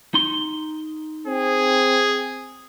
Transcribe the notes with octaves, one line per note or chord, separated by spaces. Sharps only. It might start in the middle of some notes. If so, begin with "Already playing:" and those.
D#4 C6
C4 G#4